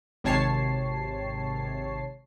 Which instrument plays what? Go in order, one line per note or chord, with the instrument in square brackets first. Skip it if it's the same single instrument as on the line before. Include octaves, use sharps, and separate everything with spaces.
[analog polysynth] G#1 C3 C#5 A5 C7